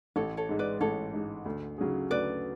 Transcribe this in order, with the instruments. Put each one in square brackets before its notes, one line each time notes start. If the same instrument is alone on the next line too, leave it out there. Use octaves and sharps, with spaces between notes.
[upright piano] A1 [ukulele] A4 C#5
[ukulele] A4 C#5
[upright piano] G#2 G#3
[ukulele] B4 D5
[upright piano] A1 [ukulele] A4 C#5
[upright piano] G#2 G#3
D2
C#3 F#3 C#4 G#4
[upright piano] D2 [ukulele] B4 D5